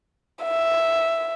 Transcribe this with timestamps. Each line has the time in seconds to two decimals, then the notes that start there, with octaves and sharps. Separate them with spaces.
0.44 E5